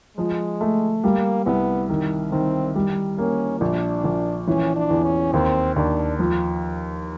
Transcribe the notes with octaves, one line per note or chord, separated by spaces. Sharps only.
F3 G#3
A3
G3 A#3
C2 B3
D#3
D#3 C4
G3
A#3 C#4
A#1 D4
A#1
E3 C#4
D4
E2
C#4
D#2 C4
D#2 D4
F3